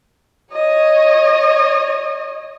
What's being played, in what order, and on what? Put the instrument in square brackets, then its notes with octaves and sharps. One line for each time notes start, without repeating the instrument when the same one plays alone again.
[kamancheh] C#5 D#5